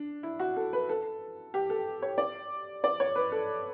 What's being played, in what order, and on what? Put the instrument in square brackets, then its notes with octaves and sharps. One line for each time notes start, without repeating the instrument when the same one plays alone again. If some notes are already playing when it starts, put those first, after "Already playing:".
Already playing: [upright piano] D4
E4
F#4
A4
B4
A4
G4
A4
C#5
D5
D5
C#5
B4
A4